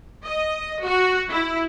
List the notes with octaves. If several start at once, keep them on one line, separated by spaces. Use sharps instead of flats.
D#5
F#4
E4